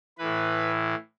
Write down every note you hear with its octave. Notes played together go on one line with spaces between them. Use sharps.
A2 E3 B4